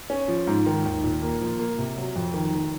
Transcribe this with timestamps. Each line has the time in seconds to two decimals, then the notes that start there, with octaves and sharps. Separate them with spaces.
0.10 C#4
0.28 F3
0.47 G#2
0.66 D#3
0.85 D#2
1.04 A#2
1.22 A#3
1.41 F3
1.59 A#3
1.78 C3
1.97 F#3
2.15 F2
2.34 D#3
2.52 F1